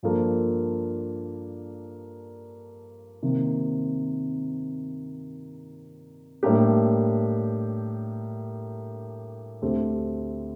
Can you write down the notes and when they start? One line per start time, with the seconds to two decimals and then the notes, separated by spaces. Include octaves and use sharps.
0.03 G2 F3 A#3 D4 A4
3.23 C3 D#3 A#3
6.43 A2 G3 A#3 D4 G4
9.62 D2 D3 A3 C4 G4